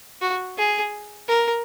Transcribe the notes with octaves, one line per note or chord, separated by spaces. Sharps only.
F#4
G#4
A#4